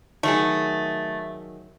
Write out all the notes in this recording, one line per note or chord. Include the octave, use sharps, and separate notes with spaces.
D#3 F#3 A3 G#4